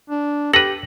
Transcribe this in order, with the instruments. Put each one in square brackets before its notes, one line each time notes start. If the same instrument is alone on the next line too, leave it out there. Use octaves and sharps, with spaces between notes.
[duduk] D4
[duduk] G4 [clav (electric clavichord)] A4 B4 [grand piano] A#6 [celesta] F#7